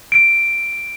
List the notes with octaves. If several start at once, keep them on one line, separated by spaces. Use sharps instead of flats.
D7